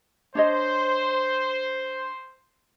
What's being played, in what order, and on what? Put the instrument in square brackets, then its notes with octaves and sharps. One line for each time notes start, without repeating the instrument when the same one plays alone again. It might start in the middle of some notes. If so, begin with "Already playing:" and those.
[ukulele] D4 C#5 D#5 [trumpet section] C5